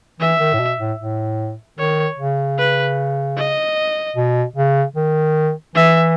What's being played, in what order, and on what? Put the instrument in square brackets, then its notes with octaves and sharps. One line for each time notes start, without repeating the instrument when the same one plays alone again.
[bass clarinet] E3 [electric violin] E5
[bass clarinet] D#3
A2
B2
A2
A2
[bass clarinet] D#3 [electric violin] C#5
[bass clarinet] C#3
[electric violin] B4
D#5
[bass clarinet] B2
C#3
D#3
[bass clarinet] E3 [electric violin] E5